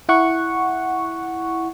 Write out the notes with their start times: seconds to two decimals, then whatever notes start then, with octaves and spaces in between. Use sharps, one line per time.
0.09 E4 F#5 C#6